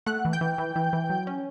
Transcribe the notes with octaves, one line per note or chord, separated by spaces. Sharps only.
A3 F#5 F#6
E3
G5 G6
E3
E3
E3
E3
F#3
C#4